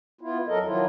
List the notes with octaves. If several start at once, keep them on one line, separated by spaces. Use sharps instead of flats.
B3 E4 F4
F2 F#3 A4 A#4 D#5
D#3 F3 F#3 E4 F4